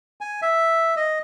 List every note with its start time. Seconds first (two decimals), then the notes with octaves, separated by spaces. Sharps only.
0.21 G#5
0.42 E5
0.97 D#5